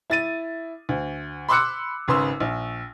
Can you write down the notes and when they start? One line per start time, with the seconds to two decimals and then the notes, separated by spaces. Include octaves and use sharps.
0.10 E4 A6 D#7
0.89 D2
1.49 B5 C6 D6 E6 F#6 C#7
2.08 G#1 C#3 B4 C6 E6
2.40 A#1